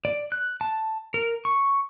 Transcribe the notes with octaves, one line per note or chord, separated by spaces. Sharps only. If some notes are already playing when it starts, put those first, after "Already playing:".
D5
F#6
A5
A#4
C#6